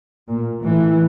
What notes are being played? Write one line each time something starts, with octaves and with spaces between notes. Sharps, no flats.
A#2
A2 E3